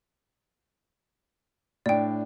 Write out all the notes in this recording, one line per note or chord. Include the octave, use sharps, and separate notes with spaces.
A2 D4 D5 G5